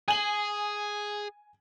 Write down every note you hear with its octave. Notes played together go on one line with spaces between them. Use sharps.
G#4 G#5 F#7